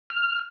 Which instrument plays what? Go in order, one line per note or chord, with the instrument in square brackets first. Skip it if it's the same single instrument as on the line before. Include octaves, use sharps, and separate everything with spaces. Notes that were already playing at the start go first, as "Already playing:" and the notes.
[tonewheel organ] F6